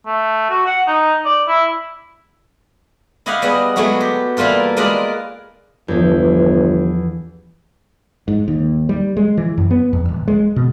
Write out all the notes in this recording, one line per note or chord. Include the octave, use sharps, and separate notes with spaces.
A3
F#4
F#5
D#4
D5
E4
E4 G4 D#5 F5 F#5
G3 B3 G#4 D#5
F#3 G#3 A3 B3 F#4
G4
E3 G3 A#3 F4 A4
G#3 A#3 F4 B4 D5 D#5
G1 E2 F3
G#2
D#2
G3
G#3
E3
F#2
B3
E2
D1
G#3
B2